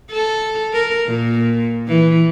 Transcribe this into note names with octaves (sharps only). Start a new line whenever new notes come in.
A4
A#4
A#2
E3